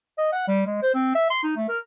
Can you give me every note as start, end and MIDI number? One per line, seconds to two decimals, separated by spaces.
0.18 0.32 75
0.33 0.46 78
0.48 0.64 55
0.67 0.77 56
0.83 0.90 72
0.95 1.13 60
1.15 1.29 76
1.30 1.41 84
1.44 1.56 63
1.57 1.66 57
1.69 1.78 70